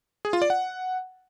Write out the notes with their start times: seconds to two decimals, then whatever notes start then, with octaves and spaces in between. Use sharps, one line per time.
0.25 G#4
0.33 F4
0.42 D5
0.50 F#5